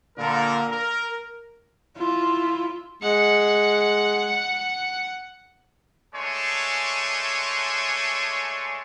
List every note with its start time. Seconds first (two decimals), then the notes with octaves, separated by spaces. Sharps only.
0.18 A#2 D3 A#3 A#4
0.70 A#4
1.96 E4 F4
3.02 G#3 F#5 C#7
6.15 G#3 A3 D4 C#5 G#5 C6